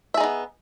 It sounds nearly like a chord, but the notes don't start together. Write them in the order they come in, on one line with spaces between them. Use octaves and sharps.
E5 G#4 D#4 B3